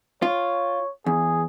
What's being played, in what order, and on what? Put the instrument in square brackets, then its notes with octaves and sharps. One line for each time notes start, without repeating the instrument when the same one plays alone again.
[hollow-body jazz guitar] F4 [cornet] C#5
[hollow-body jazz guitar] E2 [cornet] G#4